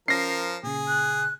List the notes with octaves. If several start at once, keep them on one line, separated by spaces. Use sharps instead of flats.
F3 C#4 A#4 A#6 C7
A#2 C#3 G#4
F#6